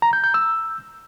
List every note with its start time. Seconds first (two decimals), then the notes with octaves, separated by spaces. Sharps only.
0.02 A#5
0.13 G6
0.24 G6
0.34 E6